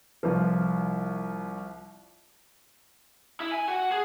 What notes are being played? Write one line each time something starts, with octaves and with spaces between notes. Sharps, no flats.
C2 F3
E4
G#5
F#4
G#4